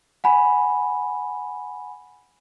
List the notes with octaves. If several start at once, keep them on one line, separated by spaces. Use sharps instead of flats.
F#5 G#5 B5